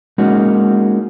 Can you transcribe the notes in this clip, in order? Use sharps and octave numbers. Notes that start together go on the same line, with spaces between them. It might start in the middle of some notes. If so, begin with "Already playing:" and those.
G#3 A#3 C#4 D#4 F#4